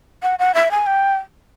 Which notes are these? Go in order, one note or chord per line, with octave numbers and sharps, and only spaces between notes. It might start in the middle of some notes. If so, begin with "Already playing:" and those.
F#5
F#5
E5
G#5
G5